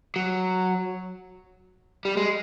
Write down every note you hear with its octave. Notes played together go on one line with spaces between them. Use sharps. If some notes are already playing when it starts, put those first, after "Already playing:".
F#3
G3
G#3